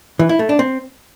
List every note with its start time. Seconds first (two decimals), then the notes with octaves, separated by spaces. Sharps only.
0.19 E3
0.29 E4
0.39 A3
0.49 D4
0.59 C4